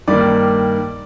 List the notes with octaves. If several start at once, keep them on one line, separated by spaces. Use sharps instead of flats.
G2 D#3 G3 A#3 D5